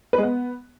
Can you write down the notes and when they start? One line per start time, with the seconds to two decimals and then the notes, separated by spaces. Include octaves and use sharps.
0.13 B4
0.18 G#3
0.23 B3